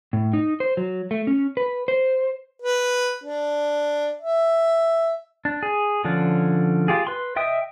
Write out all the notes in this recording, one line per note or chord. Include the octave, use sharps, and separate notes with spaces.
A2
D#4
C5
F#3
A3
C#4
B4
C5
B4
D4
E5
D4
G#4
D3 F3 C#4 D4
F4 G4 G#4
B4 C6
D#5 E5 G5 D#6